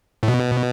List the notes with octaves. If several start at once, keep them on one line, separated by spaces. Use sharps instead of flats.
A2
B2